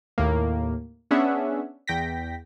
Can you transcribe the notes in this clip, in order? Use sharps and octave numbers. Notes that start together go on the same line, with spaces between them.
D#2 A2 A#3
B3 C#4 D4 G#4 E5 F#5
E2 G5 A#6 B6